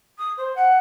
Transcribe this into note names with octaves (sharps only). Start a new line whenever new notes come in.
D#6
C5
F#5